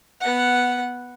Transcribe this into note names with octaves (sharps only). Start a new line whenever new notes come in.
B3 F#5